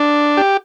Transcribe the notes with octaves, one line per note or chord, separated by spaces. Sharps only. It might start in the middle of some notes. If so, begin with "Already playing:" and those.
Already playing: D4
G4